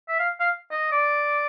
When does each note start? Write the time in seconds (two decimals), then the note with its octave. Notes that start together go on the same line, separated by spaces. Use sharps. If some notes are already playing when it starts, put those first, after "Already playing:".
0.08 E5
0.19 F5
0.40 F5
0.71 D#5
0.92 D5